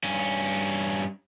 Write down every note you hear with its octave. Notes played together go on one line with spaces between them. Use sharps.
G2 C#4